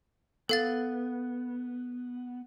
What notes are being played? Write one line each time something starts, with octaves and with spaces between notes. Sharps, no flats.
B3 A4 F5 A6